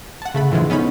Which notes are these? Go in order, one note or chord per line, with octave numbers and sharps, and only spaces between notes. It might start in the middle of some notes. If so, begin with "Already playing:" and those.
F#5 A5
C#3 A3 B5
A2 D3 E3 F3 G#3
B3 C#4 D#4 B5